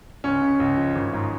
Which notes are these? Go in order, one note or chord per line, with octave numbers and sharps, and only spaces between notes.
C#2 C#4
C#3
C#2
F3
G#1
G#2